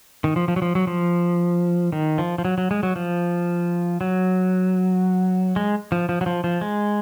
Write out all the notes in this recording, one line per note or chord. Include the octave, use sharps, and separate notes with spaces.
D#3
F3
F3
F#3
F3
F#3
F3
D#3
F3
F3
F#3
F#3
G#3
F#3
F3
F#3
G#3
F3
F3
F#3
F3
F3
G#3